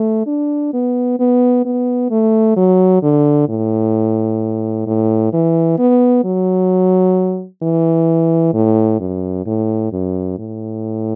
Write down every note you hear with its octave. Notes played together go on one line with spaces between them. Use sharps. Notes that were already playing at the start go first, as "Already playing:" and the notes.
Already playing: A3
D4
B3
B3
B3
A3
F#3
D3
A2
A2
E3
B3
F#3
E3
A2
F#2
A2
F#2
A2